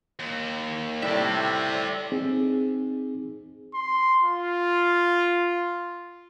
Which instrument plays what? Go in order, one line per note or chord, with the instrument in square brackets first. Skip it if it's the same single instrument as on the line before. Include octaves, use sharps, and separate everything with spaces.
[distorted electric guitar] D#2
[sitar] A2 C3 G3 [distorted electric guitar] D5 E5
[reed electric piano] C4 D#4 G#4
[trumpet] C6
F4